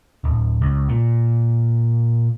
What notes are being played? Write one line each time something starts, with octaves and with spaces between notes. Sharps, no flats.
D1
C#2
A#2